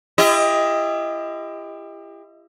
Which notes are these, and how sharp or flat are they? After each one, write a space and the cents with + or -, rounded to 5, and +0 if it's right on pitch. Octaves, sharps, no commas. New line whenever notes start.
E4 +40 G4 +35 D#5 +15